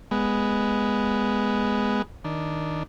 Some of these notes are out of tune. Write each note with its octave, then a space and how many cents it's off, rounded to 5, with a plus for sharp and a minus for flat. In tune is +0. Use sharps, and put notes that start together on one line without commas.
G#3 +0 B3 +0
D#3 +10 D4 +0